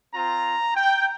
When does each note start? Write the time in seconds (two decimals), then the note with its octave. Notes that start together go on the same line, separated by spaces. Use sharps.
0.13 C4 F4 A#5
0.75 G5